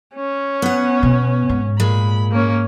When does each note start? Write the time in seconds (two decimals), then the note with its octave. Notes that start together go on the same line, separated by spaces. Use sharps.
0.15 C#4
0.62 B3 F#5
1.03 B2
1.49 G#2
1.80 A#2 G#3 B5
2.31 A#3 C#4